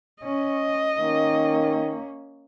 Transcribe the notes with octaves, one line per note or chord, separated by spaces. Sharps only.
C#4 D#5
D#3 A#3 C#4